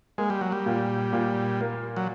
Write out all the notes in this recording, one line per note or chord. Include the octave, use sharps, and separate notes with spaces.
G#3 A#3
G3
F#3
G3
A#2
A#2
A#3
F#3